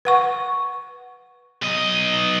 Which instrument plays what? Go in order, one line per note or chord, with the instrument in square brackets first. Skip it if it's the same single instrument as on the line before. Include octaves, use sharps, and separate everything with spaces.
[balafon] B4 F#5 C#6
[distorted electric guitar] B1 D#5